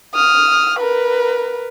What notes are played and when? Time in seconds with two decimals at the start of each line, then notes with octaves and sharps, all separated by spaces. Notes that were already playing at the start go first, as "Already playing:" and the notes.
0.14 D#6 F6
0.80 A#4 B4